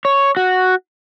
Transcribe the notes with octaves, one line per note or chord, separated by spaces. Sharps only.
C#5
F#4